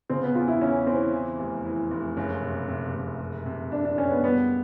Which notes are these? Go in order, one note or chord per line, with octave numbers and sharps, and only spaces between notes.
C#3 C4
B3
E2 F4
E4
E2 C#4
E3 C4
E3
F1
E3
F1
F#1 C#4
C3
C3
F#1
F#1
C3
F#1 D4
D4
F#1 C#4
B3
G3 B3